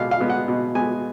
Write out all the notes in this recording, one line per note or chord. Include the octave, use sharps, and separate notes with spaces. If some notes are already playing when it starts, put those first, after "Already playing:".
Already playing: B2 G#3 B3 F5
F5
G#3 B3
F#5
B2
G#3 B3 G#5